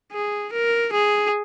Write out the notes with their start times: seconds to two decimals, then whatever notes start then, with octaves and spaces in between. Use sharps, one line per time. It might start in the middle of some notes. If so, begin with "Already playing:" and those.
0.12 G#4
0.53 A#4
0.93 G#4